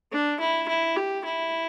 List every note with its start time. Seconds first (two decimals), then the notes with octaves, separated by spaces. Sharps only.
0.12 D4
0.40 E4
0.68 E4
0.96 G4
1.25 E4